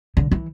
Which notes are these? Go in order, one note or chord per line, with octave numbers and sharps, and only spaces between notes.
D3
E3